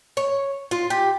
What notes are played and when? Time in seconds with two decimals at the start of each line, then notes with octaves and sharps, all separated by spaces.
0.17 C#5
0.71 F4
0.90 G4